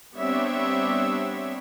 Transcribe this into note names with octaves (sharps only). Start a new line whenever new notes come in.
G3 B3 C4 D4 C#5 E5